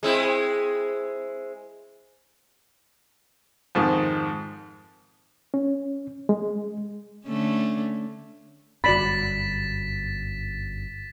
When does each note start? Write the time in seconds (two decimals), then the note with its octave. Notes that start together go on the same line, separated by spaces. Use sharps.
0.03 G#3 C4 E4
3.75 F2 G#2 D#3
5.54 C#4
6.29 G#3
7.26 D3 A3 C#4
8.84 G1 F#2 F#4 D5 B5 A6 B6 E7